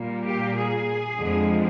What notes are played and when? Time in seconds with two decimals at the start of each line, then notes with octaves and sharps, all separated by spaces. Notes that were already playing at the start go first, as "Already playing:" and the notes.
Already playing: A#2 G3 A#3
0.25 G4
0.57 G#4
1.20 F2 D3 F3 G#3